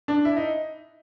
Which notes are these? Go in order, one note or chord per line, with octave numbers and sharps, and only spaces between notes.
D4
E4
D#4